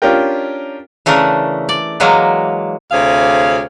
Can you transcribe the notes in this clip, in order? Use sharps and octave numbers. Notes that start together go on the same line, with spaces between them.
C#4 D4 F4 G4 A#4 G5
C#3 E3 A3 D4 A#4
D5
E3 F#3 G#3 A#3
D2 C3 G#4 C#5 F5